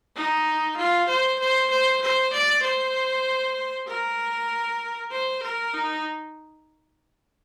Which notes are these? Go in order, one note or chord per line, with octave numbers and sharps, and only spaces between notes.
D#4
F4
C5
C5
C5
C5
D5
C5
A#4
C5
A#4
D#4